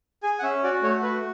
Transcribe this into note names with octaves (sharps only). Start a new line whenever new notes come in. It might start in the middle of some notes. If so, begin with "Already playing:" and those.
G#4 G#5
F#5
C#4 E5
F#4 D5
A3 C#5
F#4 B4